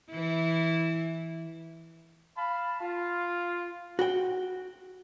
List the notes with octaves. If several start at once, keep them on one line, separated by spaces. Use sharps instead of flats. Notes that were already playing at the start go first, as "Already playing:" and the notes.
E3 E4
F5 A5 B5
F4
F#4 G5